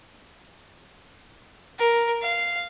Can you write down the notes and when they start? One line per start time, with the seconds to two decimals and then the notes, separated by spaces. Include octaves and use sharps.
1.79 A#4
2.22 F5